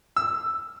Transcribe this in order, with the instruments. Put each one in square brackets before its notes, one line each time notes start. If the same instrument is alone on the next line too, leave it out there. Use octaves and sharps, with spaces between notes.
[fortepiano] E6